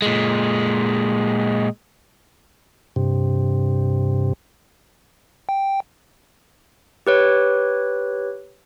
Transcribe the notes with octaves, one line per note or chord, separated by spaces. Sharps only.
A#2 G#3
G2 C3
G5
G4 B4 C#5